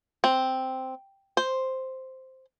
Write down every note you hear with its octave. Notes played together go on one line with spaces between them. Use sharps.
C4
C5